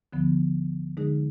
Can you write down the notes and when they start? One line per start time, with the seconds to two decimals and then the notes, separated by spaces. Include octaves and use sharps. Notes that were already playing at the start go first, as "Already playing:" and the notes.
0.13 D2 D3 F3 B3
0.97 D3 G#3 D#4 G#4